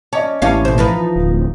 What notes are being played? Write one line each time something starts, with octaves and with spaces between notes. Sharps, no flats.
C#4 D5 D#5 A5
A1 E3 G3 C#4 F5 A5
B2 C5
F3 D#4 B4
D1